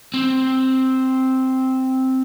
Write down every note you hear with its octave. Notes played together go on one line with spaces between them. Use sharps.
C4